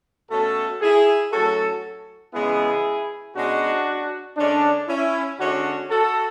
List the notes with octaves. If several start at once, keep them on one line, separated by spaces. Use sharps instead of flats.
B2 A3 C#4 F#4 A4
E4 G#4
A2 F#3 C#4 F#4 A4
C#3 E3 G#3 B3 E4 G#4
B2 G#3 C#4 D4 F#4
D3 G#3 C#4 D4
C#4 E4
D3 G#3 C#4 D4 F#4
F#4 A4